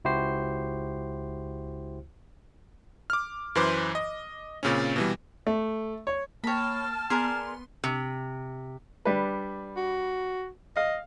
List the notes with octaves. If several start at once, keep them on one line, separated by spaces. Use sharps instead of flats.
C#2 E4 F#4 G4 C5 C7
D6 F6
F#2 E3 B4 C5 C6 D6
D#5
A#2 C#3 C4 C#4
B2 E3 G3
A3
C#5
A#3 C#5 G5 A5 B5 F6
B3 G#4 A#4 D5 C6
C3
G3 D4 B4
F#4
D#5 F5